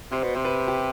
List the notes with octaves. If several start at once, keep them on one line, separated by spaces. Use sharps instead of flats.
C3 C5
B2
C3 C5
B4
G4